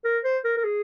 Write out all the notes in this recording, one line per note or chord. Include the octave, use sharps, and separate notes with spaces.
A#4
C5
A#4
A#4
G#4